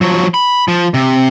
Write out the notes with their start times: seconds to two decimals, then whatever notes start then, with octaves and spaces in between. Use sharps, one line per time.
0.01 F3 F#3
0.34 B5
0.68 F3
0.94 C3